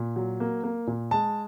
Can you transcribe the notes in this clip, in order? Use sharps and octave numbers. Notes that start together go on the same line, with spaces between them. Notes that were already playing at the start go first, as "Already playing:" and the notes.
Already playing: A#2
F#3
A#3
A#3
A#2
G#3 A5